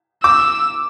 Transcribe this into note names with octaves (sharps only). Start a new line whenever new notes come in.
D6 E6